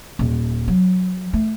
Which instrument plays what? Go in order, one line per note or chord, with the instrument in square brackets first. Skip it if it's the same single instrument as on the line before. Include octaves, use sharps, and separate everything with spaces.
[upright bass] D#1
F#3
A3